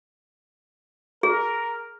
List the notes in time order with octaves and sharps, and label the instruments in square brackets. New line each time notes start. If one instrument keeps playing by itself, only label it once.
[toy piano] G#4 [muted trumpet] A#4